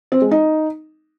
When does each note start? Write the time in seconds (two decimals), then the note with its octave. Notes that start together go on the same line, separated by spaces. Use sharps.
0.12 C4
0.22 G#3
0.31 D#4